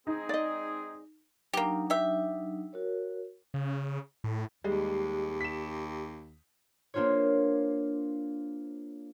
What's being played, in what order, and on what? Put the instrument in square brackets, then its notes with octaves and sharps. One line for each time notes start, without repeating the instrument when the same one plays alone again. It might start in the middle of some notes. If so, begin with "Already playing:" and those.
[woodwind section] G#3 C4 G#4 [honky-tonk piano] D#4
[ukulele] D5 D#5
[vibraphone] F#3 D4 D#4 [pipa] A#3 G4
[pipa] G4 E5
[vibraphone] F#4 A#4 C#5
[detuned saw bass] C#3
A2
[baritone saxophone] D#2 [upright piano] G3 G#3 [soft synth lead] G4
[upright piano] B6 E7
[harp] A#3 D4 F4 C5 C#5